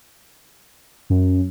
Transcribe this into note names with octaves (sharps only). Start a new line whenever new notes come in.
F#2